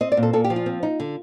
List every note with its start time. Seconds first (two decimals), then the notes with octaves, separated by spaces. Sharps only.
0.01 C4 D#5
0.12 D5
0.17 A#2
0.23 A4
0.33 A#2 A4
0.44 G4
0.50 F3
0.56 F4
0.66 C4
0.83 D#4
1.00 D3